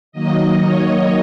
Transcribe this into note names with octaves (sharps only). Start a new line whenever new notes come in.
D#3 F#3 A#3 D#5
C#5